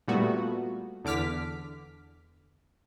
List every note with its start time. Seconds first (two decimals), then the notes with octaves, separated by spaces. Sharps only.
0.08 A#2 G3 A3 B3 F#4
1.05 E2 D3 D6 F6 B6